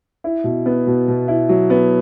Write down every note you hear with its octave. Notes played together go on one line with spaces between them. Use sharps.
E4
B2
B3
B2
B2
E4
F#3
B3